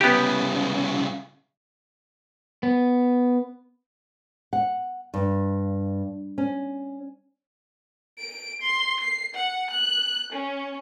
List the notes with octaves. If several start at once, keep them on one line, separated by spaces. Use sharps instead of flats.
C2 C#3 B3 G4
B3
F#5
G2
C#4
D7
C6
C7
F#5
F#6
C#4